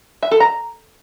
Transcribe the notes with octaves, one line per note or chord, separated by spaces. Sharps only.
E5
A4
A#5